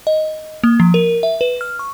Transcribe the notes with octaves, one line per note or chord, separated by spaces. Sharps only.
D#5
A#3
F3
A#4
E5
B4
F6
C#6